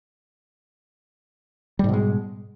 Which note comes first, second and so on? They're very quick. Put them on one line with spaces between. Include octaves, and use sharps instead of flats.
G3 G#2 B2 G#3